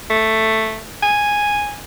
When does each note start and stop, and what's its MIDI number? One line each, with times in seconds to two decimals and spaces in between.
0.10 0.84 57
1.03 1.77 80